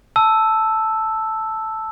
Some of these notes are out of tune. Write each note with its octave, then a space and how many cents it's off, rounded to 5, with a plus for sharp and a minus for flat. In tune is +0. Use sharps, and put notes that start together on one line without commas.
A5 +0 E6 +0